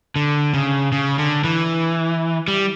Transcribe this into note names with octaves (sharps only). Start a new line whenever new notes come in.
D3
C#3
C#3
D3
E3
G3